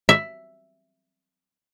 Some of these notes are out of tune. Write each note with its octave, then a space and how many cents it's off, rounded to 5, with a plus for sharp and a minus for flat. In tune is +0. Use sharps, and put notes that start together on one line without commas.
E5 +5